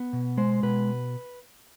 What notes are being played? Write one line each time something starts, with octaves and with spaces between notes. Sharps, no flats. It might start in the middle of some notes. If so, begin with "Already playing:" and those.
Already playing: B3
B2
G#3 C5
B2 B4